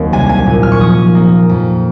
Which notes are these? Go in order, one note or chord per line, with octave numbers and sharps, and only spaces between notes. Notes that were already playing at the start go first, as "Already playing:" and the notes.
Already playing: D#2 F#3 C4
C2 G#5
G#5
A#2
F6
C#6
F3 D#6
A#3
F2